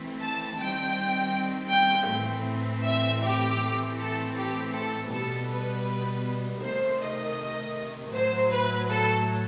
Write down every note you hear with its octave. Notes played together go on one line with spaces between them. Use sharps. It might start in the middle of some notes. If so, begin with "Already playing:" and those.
Already playing: E3 A3 C4
A5
D#3 G3 C4 G5
G5
A2 E3 A3 C4
E5
G4
A2 E3 A3 C4
A4
G4
A4
B2 G3 B3 A4
B4
C3 D#3 A3 C5
D#5
A2 F#3 A3 C5
B4
A4